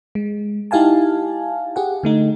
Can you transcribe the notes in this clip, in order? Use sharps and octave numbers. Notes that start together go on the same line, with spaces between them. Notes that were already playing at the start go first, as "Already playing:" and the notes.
G#3
D#4 E4 G4 F5 G#5 A5
G4 G#4 F#5
D3 A3 D#4